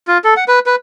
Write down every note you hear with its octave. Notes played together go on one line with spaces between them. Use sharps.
F4
A4
F#5
B4
B4